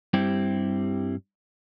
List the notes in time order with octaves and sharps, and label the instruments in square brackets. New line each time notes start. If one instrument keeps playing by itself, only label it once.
[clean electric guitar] G2 G3 C4 E4 G4